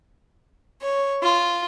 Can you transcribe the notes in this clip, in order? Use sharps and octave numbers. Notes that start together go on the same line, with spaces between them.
C#5
F4